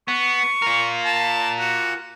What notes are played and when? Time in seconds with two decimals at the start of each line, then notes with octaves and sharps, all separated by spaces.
0.08 B3 C#6
0.62 F4 A#4
1.05 A5
1.59 F#4